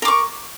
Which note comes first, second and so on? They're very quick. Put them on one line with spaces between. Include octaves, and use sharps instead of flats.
A#4 D6 C#6